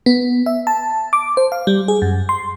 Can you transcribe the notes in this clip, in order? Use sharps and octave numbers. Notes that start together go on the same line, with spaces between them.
B3
E5
A5
D6
C5
F5
G3
G#4
F#2
C6